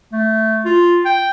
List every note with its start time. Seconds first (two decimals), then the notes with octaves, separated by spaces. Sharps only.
0.12 A3
0.65 F4
1.05 G5